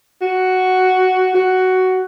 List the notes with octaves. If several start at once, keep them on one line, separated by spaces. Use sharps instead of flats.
F#4
F#4